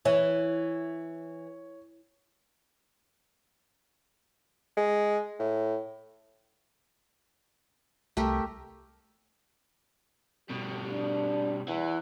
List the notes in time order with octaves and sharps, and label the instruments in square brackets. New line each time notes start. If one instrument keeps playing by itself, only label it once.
[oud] E3 [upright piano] C#5
[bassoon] G#3
A2
[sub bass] C2 [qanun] A3 G4 A#4
[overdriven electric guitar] B2 G3 [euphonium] G4
[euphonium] D4
[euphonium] E2 [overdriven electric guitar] E3